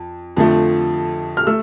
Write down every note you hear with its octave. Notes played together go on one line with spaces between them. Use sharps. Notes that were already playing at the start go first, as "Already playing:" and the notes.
Already playing: F2
F2 D3 F3 A3
F6
A3 E6